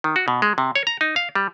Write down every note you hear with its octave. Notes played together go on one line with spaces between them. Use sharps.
D#3
F#4
B2
G#3
C3
C#5
A#5
D#4
F5
G3